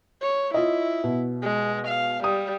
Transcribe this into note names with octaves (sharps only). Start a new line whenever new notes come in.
C#5
E4 F4 D#5
B2
G#3
F5
G3 D#6